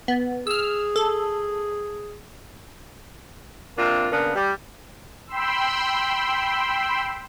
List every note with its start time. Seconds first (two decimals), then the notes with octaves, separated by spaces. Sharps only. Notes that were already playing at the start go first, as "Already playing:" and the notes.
0.08 B3
0.47 G#4 E6 F6
0.96 A4
3.78 C3 A#3 D4 F4
4.12 C#3 A#3 B3 D4
4.35 G3
5.27 G5 B5 C6 E6